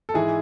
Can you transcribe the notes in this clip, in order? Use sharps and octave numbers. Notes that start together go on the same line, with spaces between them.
A4
G#2 E3 E4 G#4